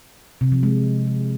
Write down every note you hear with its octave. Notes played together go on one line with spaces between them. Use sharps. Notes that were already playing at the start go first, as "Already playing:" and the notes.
C3
F3
G#3